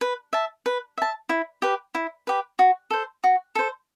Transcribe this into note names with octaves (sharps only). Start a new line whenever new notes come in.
B4
E5 A5
B4
E5 A5
E4
G4 B4
E4
G4 B4
F#4
A4 C5
F#4
A4 C5